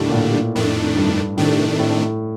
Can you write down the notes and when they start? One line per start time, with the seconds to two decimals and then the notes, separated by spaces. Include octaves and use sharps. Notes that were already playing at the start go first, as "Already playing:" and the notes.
Already playing: D#2 A2 D3 G3 D4
0.09 A#2
0.14 A2
0.55 F2 A2 D#3 A3 D4
0.97 G2
1.37 A2 C3 D#3 A3 D4
1.79 A2